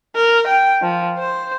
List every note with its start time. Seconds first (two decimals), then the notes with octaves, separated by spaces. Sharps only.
0.16 A#4
0.47 G5
0.82 F3
1.19 C5